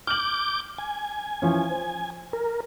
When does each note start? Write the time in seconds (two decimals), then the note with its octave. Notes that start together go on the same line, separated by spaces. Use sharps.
0.07 D6 F6 G6 F#7
0.78 G#5
1.42 E3 F3 C#4
1.70 C5
2.33 A#4